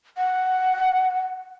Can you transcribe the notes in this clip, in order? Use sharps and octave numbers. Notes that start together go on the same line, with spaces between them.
F#5